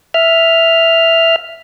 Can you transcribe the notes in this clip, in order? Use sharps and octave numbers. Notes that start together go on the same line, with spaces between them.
E5 F6